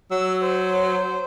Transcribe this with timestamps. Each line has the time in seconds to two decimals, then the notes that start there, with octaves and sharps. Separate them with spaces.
0.11 F#3 E6
0.42 C5